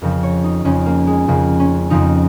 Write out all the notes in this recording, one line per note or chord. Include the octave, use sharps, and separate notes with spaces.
F2 C#3 F3 A#4
C#5
D#4
F2 C#3 F3 C#4
A#3
G#3
F2 C#3 F3 A#3
C#4
F2 C#3 F3 D#4